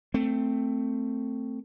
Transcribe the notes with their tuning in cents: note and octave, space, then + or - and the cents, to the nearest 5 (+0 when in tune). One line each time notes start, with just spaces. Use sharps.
A3 +15 C4 +0